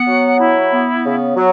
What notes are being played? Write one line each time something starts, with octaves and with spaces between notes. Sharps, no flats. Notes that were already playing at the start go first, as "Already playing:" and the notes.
Already playing: B3 F#5
F#3
E4
B3
C#3
F#3